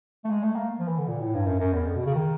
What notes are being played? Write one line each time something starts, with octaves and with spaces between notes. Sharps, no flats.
A3
G#3
A3
A#3
F3
E3
D3
A#2
A2
G2
F#2
F#2
E2
F2
B2
C#3
D#3